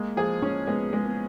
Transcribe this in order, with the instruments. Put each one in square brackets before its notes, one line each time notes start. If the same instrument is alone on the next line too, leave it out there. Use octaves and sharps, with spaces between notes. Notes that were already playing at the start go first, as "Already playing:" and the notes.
Already playing: [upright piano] G#3 [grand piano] A#3
[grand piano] F3 [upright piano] G#4
[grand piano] F3 [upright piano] C#4
[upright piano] G#3 [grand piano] B3
[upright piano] G#3
[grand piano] B3